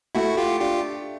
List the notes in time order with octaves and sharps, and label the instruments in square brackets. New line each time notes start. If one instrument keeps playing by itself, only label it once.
[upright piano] A3 [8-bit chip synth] E4 F#4
[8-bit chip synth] F4 G4
[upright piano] D4 [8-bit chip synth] F4 G4